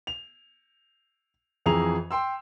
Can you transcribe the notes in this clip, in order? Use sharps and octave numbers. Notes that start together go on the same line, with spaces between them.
F7
F2 E3 G#4 A#5 F7
G5 C6 E6